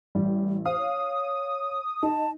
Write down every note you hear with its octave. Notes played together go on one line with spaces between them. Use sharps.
A1 G3
C5 F5 D#6
C#5
D#4 A5